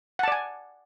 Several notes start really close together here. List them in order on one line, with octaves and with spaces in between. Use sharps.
F#5 A5 D5 G#5